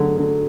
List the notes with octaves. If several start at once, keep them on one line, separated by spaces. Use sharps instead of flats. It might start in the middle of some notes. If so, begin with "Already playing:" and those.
Already playing: D3 F#3 G#3
D3